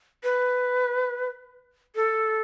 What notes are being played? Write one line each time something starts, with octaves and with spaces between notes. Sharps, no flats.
B4
A4